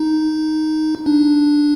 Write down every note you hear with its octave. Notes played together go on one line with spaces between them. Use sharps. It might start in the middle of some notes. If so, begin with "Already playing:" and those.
Already playing: D#4
D4